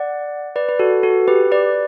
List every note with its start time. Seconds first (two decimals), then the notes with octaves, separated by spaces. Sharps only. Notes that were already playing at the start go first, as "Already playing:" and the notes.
Already playing: D5 F#5
0.56 B4 D5
0.69 B4
0.79 F#4 A4
1.03 F#4 A4
1.28 G4 B4
1.52 B4 D5